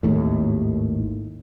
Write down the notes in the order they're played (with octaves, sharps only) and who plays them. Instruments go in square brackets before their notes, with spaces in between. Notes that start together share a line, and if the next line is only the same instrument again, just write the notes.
[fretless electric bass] G#1 D#2 A2